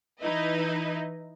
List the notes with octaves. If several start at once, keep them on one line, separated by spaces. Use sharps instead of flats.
E3 D#4 E4 B4 D#5